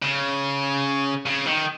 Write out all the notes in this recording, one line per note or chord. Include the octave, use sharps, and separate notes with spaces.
C#3
C#3
D#3